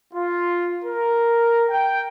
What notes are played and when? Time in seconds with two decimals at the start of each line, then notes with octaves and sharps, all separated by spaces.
0.13 F4
0.83 A#4
1.69 G5